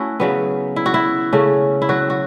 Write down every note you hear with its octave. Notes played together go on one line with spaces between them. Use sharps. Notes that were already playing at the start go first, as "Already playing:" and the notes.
Already playing: A3 C#4 E4 F#4
C#3 F#3 B3
E4
F#4
E4
C#3 A3 C#4
E4
F#3 F#4
F#4